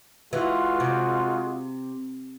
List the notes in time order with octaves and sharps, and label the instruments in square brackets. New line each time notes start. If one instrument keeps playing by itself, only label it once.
[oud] E3 [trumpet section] G#3 F4 F#4
[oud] C3